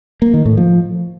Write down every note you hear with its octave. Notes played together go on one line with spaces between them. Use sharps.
A#3
D#3
A2
F3